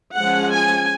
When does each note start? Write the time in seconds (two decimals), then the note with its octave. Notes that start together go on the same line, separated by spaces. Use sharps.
0.16 F3 G#3 C#4 F#5
0.51 G#5